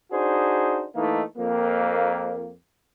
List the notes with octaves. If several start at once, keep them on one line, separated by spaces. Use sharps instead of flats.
D4 D#4 F#4 G#4 C5
E3 A3 A#3 D#4
F2 A#3